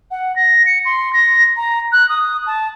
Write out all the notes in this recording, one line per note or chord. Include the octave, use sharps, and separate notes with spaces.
F#5
A#6
C#7
C6
A#6
A#5
F#6
D#6
A5